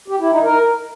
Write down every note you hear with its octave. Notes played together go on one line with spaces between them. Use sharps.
G4
E4
D#4
A#4